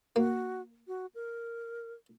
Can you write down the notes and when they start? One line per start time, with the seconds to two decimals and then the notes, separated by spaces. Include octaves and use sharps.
0.16 A#3 F#4
0.88 F#4
1.15 A#4